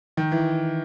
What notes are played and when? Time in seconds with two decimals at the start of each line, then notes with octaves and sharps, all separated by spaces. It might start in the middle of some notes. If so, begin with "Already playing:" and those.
0.17 D#3
0.32 E3